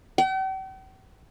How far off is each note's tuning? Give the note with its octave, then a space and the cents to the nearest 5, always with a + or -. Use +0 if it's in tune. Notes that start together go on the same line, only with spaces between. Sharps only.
G5 -45